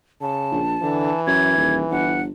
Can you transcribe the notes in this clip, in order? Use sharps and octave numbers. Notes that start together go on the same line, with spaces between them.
C#3 A5
A#1
D3 E3
F#2 G#6
D#1
G1 F#5